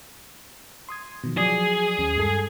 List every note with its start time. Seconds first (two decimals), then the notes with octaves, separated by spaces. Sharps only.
0.89 C6 D#6 G#6
1.24 B2 D#3 F3
1.37 F3 F#3 G#4 D5
1.98 D#2 C#4
2.16 G2 G#3 A4